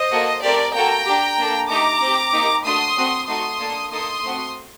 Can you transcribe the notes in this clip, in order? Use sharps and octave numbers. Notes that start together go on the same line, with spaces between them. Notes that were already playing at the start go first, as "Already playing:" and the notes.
Already playing: C5 D#5
A#3 F#4 A4
A3 C4 G4 A#4 D5
A#3 F#4 A4 G5 A#5
D4 G4
A#3 D4 A4
A3 D#4 G4 A#5 D6
C4 G4
A#3 D#4 G4
A3 D4 F#4 C6 D#6
A3 C4 F#4
A3 D#4 F#4 A4 C6 D#6
A#3 D4 A4
A#3 D#4 A4 C6 D#6
A3 C4 F#4